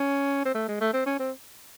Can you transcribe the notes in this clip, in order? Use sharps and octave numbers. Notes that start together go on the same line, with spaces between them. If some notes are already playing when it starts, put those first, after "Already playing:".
Already playing: C#4
C4
A3
G#3
A3
C4
C#4
C4